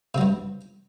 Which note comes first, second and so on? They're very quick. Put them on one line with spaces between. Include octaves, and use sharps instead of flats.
C3 F#3 G2